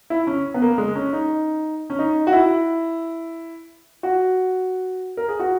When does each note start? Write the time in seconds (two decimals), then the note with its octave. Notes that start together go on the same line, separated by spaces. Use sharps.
0.10 E4
0.27 C#4
0.54 B3
0.62 A#3
0.78 G#3
0.96 C#4
1.13 D#4
1.90 C#4
1.99 D#4
2.27 F#4
2.33 E4
4.03 F#4
5.17 A#4
5.29 G#4
5.40 F#4